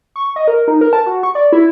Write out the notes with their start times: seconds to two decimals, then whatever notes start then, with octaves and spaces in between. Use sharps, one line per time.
0.16 C#6
0.36 D#5
0.48 A#4
0.68 D#4
0.81 A#4
0.93 A5
1.06 F#4
1.23 C#6
1.35 D5
1.52 E4